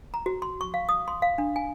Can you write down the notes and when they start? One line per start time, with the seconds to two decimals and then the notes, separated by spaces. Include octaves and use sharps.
0.14 A#5
0.26 F#4
0.42 C6
0.61 C#6
0.74 F5
0.89 D#6
1.08 C6
1.22 F5
1.38 D4
1.56 G#5